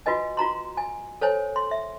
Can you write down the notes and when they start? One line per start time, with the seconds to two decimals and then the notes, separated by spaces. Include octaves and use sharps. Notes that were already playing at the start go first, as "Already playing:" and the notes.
0.06 F4 F#4 B4 D#5 G#5
0.37 F4 F#4 A#5 C6
0.77 G#5
1.21 A4 C5 C#5 G#5
1.56 C6
1.71 E5